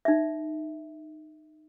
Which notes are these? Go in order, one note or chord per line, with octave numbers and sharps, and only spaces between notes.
D#4 E5